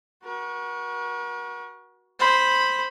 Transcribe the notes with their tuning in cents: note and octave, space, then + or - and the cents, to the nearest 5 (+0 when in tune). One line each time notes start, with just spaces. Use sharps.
F#4 +0 A#4 +45
C5 +0 B5 +0